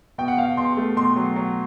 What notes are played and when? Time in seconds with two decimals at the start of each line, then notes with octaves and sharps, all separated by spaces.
0.18 B2 G5
0.28 F#5
0.38 B2 F5
0.57 B2 C6
0.77 A3
0.97 B2 C6
1.16 F#3
1.36 F#3